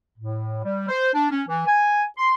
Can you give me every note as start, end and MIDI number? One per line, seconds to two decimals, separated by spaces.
0.18 0.60 45
0.64 0.88 55
0.89 1.09 72
1.14 1.28 62
1.30 1.43 61
1.47 1.64 52
1.67 2.03 80
2.17 2.34 84